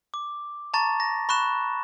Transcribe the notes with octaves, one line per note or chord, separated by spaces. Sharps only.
D6
A5 A#5 C#6 A6
A#6
B5 C#6 F#6 E7